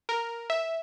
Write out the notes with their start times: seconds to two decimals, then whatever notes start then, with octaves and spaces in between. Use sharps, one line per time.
0.09 A#4
0.50 E5